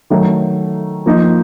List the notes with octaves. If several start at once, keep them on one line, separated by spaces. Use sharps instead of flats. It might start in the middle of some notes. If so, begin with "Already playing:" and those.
D#3 F#3 A3
F3 A#3 D#4